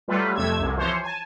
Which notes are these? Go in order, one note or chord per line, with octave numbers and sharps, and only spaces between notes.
F#3 G3 A3 F4 B4
F2 C3 A3 E6 G#6
C2 F#2 C3
E3 F3 C5 C#5
G#5 A5